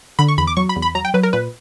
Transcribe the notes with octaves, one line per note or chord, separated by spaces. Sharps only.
D3 B5
C#6
E2 B5
D6
F#3 C#6
B5
E2
B5
F#3 A#5
G5
F#3 B4
A#4
A#2 B4